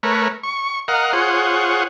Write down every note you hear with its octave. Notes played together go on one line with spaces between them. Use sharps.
A3 A#4 B4 C#5
C#6
A#4 D#5 F5 F#5
F4 G#4 C5 C#5 F#5